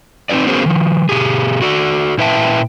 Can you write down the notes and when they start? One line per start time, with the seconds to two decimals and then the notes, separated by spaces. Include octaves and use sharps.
0.29 C4 D#4 E4 B4 D5
0.47 B3 C#4 F#4 G#4 A#4 C5
0.66 D#3 F3
1.09 B2 G4 G#4
1.62 F#4 A4 D5
2.18 A#2 E4 B4 E5 G5 A5